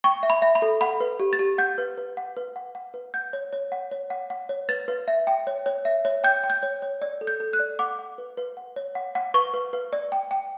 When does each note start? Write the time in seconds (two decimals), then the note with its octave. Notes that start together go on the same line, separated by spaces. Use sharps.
0.04 G5 C#6
0.23 E5
0.30 B5
0.42 E5
0.55 B5
0.62 A4
0.81 F#5 B5
1.00 B4
1.20 G4
1.33 A6
1.39 G4
1.58 F#5 G6
1.78 B4
1.98 B4
2.17 F#5
2.37 B4
2.56 F#5
2.75 F#5
2.94 B4
3.14 F#5 G6
3.33 C#5
3.53 C#5
3.72 F#5
3.91 C#5
4.10 F#5
4.30 F#5
4.49 C#5
4.69 B4 A6
4.88 B4
5.08 E5
5.27 G5
5.47 C#5
5.66 C#5
5.85 E5
6.05 C#5
6.24 G5 G6
6.44 G5
6.50 G6
6.63 C#5
6.82 C#5
7.02 D5
7.21 A4
7.27 G6
7.40 A4
7.53 F#6
7.59 D5
7.79 F#5 D6
7.99 F#5
8.18 B4
8.38 B4
8.57 F#5
8.76 C#5
8.95 F#5
9.15 F#5
9.34 B4 C#6
9.54 B4
9.73 B4
9.93 D5
10.12 G5
10.31 G5